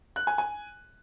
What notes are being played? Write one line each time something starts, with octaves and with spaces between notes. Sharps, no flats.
F#6
G#5
G#5